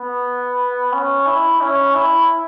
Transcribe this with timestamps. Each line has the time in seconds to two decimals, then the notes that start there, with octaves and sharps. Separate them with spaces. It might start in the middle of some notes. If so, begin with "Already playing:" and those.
Already playing: B3
0.93 C#4
1.27 E4
1.61 C#4
1.95 E4